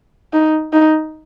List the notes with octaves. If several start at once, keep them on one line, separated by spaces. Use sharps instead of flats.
D#4
D#4